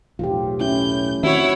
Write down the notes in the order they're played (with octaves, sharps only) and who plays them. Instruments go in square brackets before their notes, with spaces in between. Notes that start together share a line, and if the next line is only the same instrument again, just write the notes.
[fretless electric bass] B1 E2 A2 [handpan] F4 G4
[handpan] A3 C#4 E4 [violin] G6
[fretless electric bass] D#3 C4 D4 [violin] E4 C#5 [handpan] F#4 E5